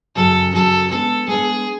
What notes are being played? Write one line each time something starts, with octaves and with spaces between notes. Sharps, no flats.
F#2 C#3 F#3 C#4 G#4 A4
F#2 C#3 F#3 C#4 G#4 A4
G#3 B3 D4 A4
G#3 B3 D4 G#4